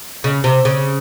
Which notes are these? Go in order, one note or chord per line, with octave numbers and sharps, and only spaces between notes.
C#3
C3
C#3